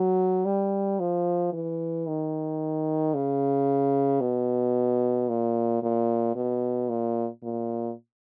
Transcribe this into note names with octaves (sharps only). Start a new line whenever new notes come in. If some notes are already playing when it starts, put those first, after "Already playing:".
Already playing: F#3
G3
F3
E3
D#3
C#3
B2
A#2
A#2
B2
A#2
A#2